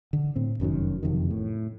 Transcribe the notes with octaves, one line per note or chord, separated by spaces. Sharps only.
D3
A2 C4
F1 F#2 D#3 F#3
F#1 F2 C3 D#3
A2